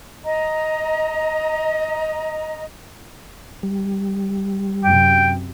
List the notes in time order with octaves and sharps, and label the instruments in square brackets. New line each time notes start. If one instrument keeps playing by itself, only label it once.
[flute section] D#5 A#5
[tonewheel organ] G3
[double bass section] F#2 C3 [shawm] G5